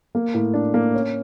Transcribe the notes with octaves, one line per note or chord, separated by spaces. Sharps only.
A#3
A2
D4
A#3
C#4